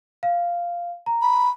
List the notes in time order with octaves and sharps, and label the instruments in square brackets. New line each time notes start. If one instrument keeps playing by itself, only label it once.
[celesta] F5
A#5
[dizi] B5